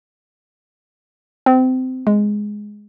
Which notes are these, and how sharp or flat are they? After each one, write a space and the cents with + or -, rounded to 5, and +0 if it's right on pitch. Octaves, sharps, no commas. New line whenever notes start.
C4 -25
G#3 +0